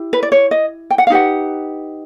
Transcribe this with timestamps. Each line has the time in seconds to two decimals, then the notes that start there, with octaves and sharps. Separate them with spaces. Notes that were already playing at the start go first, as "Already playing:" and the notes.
Already playing: E4 G4
0.13 B4
0.23 D5
0.32 C#5
0.51 D#5
0.90 G5
0.98 F#5
1.07 F5
1.10 D#4 G4 B4 F#5